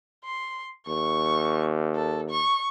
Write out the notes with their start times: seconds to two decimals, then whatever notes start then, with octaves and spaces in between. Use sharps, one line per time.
0.24 C6
0.87 D#2 C#6
1.95 A4
2.30 C#6